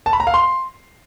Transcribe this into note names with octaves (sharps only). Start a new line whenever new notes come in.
A5
B5
A#5
F5
C6